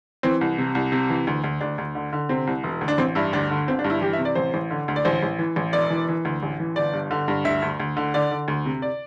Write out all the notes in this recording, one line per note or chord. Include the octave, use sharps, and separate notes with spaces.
E3 C4
C2
C3
C2
C3
E3
D2
D2
D2 D4
D2
D3
D3
C3 C4
C2
E1
D2
D4
A1 C4
G2 E4
D2 D4
D3
G1 C4
D4
G2
E4
E3 G4
E5
C3
D5
A1 C5
A1
D3
D2
D5
A1 C5
A1
E3
A1
E1 D5
E3
E3
D2
A1
E3
G1 D5
G2
D3
G2
D2 E5
D2
D2
D3
D3 D5
D3
D2
C3
D5